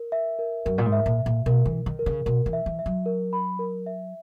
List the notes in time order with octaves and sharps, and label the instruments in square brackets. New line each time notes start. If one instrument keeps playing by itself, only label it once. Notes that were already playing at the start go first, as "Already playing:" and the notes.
Already playing: [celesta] A#4
E5
A#4
[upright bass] F#2 [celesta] A#4
[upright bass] A#2
G#2
[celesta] E5
[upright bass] A#2
[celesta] E5
[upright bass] A#2
[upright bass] B2 [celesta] A#4
[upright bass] E3
[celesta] A#4
[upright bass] D#3
[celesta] A#4
[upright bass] C#3
[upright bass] B2 [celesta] A#4
[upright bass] E3
[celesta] E5
[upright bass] E3
[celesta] E5
[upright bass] F#3
[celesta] A#4
B5
A#4
E5